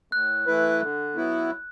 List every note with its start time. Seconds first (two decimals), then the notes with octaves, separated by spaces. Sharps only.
0.12 A2 F#6
0.46 E3 A3 E4 B4
0.82 D3
1.16 F#3 B3 E4